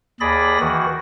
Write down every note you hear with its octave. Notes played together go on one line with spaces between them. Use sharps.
D#2 G#4 D5 B5 A#6
D#3 E3 F#4